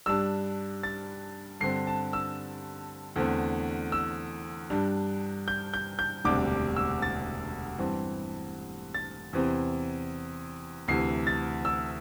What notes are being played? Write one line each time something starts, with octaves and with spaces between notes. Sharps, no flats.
G2 G3 D4 E6
A6
G2 D3 C4 C7
A5
E6
E2 D3 A3 C4
E6
G2 G3 D4
G6
G6
G6
E1 D2 C3 G3 D4 D6
E6
A6
G2 E3 C4
A6
E2 C3 E3 C4
D2 C3 E3 C7
A6
E6